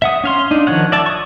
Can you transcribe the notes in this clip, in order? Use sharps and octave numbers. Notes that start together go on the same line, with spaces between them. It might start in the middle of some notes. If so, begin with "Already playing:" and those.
E5 F#5 D#6
C#4 F5 C6
D4 D#4
D#3 F3 C#5 F#5
D5 E5 A5
C#6 D#6